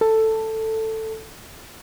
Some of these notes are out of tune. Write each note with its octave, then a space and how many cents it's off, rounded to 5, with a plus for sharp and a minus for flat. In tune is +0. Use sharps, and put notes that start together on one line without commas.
A4 +10